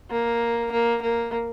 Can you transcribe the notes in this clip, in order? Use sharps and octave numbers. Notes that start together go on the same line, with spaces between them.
A#3
A#3
A#3